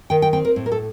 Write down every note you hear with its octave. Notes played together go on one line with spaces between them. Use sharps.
D#3 G5
G5
C4 G5
A#4
A2
A#4
A4